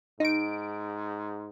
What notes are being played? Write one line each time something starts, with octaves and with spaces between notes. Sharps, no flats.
G#2 D#4 D7